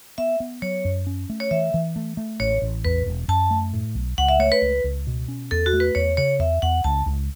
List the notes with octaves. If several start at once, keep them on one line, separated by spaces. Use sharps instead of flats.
B3 E5
B3
F#3 C#5
F#2
C#4
A3
C#5
E3 E5
E3
A3
A3
A1 C#5
A1
E2 B4
E1
F#2 A5
A3
A2
B1
C#2 F#5
E5
A3 C#5
B4
C#2
C#2
B2
C#4
E2 A4
F#4
A3
B4
E2 C#5
C#3 C#5
E2 E5
E2 F#5
C#2 A5
C#2